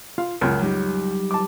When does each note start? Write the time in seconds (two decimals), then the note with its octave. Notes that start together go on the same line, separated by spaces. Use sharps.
0.18 F4 F5
0.41 C#2 F#2 A#4 A#5
0.62 F#3 G3 D#4
1.31 A5 D6